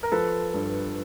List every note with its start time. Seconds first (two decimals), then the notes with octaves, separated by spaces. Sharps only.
0.03 A#4
0.12 F3 A4 B4
0.54 G2